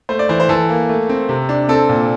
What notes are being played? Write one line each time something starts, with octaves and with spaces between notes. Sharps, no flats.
A3 C5
D5
E3 C5
C5
E3 A4
A#3
A3
C4
C3
D4
C4 A4
A#2